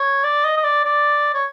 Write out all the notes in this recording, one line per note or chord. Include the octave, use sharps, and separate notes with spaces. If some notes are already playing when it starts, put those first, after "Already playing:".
Already playing: C#5
D5
D#5
D#5
D5
D5
C#5